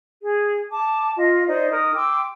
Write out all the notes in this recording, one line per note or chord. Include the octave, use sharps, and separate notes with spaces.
G#4
A5 D6
F4 D#5
D#4 C5 D5
D#4 A#4 D#6
G5 C6 D6 E6